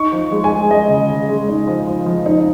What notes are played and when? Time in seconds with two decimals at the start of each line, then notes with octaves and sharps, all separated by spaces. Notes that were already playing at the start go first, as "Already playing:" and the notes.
Already playing: D#4 C#6
0.12 F3
0.32 G#3
0.44 G#5
0.51 G#3
0.70 G#3 D#5
0.89 C#3
1.09 C#3
1.29 G#3
1.48 D#4
1.67 F3
1.87 F3
2.06 F3
2.26 D#4